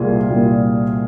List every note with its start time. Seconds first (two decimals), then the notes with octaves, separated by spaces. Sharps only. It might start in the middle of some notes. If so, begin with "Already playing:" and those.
Already playing: C2 A#2 G3 A#3 F4 G#4
0.30 C2 A#2 G3 A#3